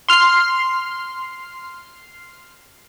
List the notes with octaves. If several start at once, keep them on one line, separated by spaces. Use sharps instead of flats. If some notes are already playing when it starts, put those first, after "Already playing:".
C6 F6 C7